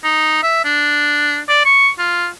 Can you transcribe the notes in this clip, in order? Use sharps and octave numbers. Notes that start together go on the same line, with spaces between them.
D#4
E5
D4
D5
C#6
F4